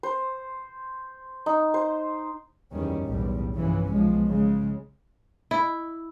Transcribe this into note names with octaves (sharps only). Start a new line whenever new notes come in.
C5
D#4
C5
F#1 E2 D#3 G3 C#4
B1 E2 A2 G3
G1 C3 E3 F3 C#4
B1 F3 G#3
C#3 G#3
E4